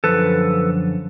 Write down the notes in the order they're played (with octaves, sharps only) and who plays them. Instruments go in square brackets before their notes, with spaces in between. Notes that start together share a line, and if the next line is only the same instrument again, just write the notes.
[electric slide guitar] F#2 D3 F3 A4 B4